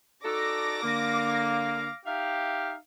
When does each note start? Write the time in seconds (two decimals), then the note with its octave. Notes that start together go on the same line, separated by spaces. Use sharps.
0.24 D#4 F#4 A4 D5 D6 A#6
0.83 D3 A#3 F5
2.06 D#4 G4 E5 F5